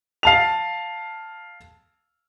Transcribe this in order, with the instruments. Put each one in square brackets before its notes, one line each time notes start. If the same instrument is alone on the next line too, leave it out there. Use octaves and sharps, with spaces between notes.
[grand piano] F5 A5 F7